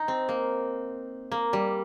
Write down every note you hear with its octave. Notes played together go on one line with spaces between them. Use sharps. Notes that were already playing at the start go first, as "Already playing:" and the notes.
Already playing: D#4
C4
A#3
A#3
G3